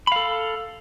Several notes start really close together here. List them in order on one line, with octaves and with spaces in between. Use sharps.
B5 F5 A4